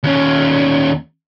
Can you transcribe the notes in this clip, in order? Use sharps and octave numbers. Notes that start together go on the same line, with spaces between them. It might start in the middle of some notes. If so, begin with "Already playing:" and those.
D#2 C#4